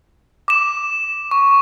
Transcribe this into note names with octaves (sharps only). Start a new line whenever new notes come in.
D6 E7
C#6